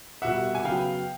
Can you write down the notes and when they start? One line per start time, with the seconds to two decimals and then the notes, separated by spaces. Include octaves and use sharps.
0.22 C2 B2 G3 E5 F#5
0.55 G#5
0.64 C#3 F#3 B3 F5 G5